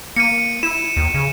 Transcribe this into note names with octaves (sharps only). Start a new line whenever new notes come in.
A#3 C#7 D#7
E4 E7
D#2
C#3